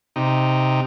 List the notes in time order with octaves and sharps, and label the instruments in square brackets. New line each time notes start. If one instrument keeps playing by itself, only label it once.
[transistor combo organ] C3 D#4